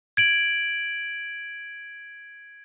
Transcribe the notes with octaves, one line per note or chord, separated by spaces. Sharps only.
G#6 D7 F#7